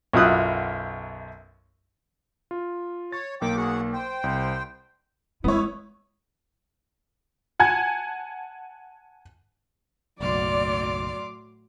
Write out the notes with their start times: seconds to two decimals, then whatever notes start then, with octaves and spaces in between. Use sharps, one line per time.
0.13 B1 F#2 E4 F4 D#6 F#6
2.51 F4
3.12 C#5 A6
3.41 B1 A#3 G5 D6
3.57 F#4 G#4 F#5
3.93 C5 G5
4.24 C2
5.44 G#3 B3 E4 F4 C#5
7.60 F#5 G#5 A5 G#6
10.21 F#1 B1 A2 F#3 D5 C6 D6 F6